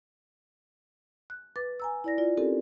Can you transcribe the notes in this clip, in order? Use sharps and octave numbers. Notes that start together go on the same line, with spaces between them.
F#6
B4 D6 A6
G#5 A#5 E6
E4 D5 A#6
F4 D5
C4 C#4 D#4 G4 A4 A#4